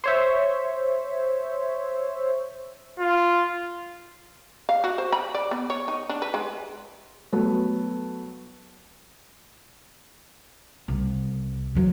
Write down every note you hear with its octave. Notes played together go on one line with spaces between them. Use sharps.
C5 C#5 E5
F4
F5
F#4
C5
B5
D5
B3
C#5
D#4
D4
B4
G#3
F#3 A3 B3
C2
E3 F#3